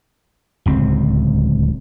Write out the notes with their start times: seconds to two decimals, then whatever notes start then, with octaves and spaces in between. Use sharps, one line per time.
0.66 D1 C#2 C4